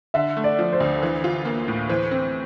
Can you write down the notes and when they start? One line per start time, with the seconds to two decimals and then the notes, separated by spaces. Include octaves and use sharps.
0.14 D3 E5
0.37 A3
0.44 D5
0.59 F3
0.73 C5
0.80 D2
1.03 E3
1.24 F4
1.45 A#3
1.68 A2
1.89 E3 C5
2.11 C4